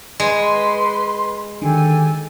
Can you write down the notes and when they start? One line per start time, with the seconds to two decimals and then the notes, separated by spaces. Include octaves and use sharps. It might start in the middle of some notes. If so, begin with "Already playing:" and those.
0.20 G#3 B4 C6
1.62 D3 D#3 G4 A4 G#5